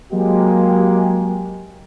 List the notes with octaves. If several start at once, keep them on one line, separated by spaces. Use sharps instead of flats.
F#3 G#3 A#3 G4